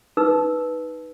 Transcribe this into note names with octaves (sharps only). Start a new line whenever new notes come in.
D#4 B4 E6